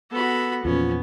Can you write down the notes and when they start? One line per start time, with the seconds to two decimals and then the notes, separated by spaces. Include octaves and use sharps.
0.11 B3 F#4 A4 B5
0.65 E2 A#2 F3 B3 C#4